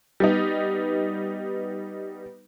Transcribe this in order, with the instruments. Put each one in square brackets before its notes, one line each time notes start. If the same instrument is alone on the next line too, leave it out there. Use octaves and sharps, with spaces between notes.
[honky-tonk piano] G3 B3 D#4